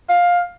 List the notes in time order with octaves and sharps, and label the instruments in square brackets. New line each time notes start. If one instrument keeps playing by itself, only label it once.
[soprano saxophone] F5